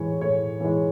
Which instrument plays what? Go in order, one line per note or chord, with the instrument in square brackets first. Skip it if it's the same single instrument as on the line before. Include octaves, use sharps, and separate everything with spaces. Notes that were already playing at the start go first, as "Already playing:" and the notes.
Already playing: [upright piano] A2 E3 G#3 C#5
A2 C#5
E3 G#3